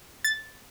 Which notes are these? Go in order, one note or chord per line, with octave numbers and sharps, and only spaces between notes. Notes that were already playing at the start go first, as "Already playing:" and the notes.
A6